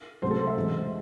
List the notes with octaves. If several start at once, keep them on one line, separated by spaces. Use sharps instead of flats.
C#2 C3 F#3 A3 C5
A4
C5
E5
E2 C3 E3 G#3